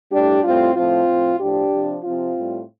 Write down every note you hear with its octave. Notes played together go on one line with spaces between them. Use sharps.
A2 G3 D4 G4
A2 G3 C4 F4
A2 F3 C4 F4
A2 F3
A2 F3 D4 G4
C3 F3
C3 F3 C4 F4
A2 G3